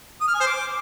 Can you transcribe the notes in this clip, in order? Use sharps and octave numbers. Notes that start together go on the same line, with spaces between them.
D#6
F6
G#5
C5
D6